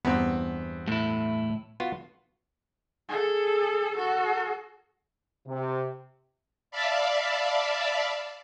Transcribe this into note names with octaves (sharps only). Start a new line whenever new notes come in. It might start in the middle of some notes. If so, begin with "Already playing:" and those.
E2 G2 B3 C4 A#5
A2 E4
B3 F4 F#4
G#4 A4
F#4 A4
C3
D5 E5 F5 A5 B5